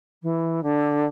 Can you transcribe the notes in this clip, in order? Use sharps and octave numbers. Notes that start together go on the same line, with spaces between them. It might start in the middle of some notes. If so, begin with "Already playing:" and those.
E3
D3